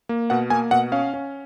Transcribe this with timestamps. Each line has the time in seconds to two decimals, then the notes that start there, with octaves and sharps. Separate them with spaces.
0.09 A#3
0.30 B2 F#5
0.50 A#3 G#5
0.71 B2 F#5
0.92 C#4 F5
1.14 C#4